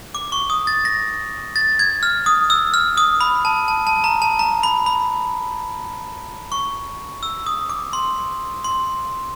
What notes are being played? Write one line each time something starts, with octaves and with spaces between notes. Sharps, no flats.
D6
C#6
D#6
A6
A#6
A6
G#6
F6
D#6
E6
F6
D#6
B5
A5
A5
A5
A#5
A5
A#5
B5
B5
C#6
E6
D#6
D6
C6
C6